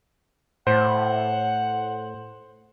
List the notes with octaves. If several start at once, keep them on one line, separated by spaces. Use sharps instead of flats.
A2 C5 F#5